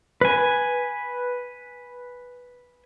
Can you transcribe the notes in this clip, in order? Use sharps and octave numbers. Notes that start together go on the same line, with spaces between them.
B4 G#5